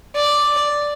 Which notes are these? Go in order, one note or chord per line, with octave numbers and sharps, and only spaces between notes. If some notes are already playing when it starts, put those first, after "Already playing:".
D5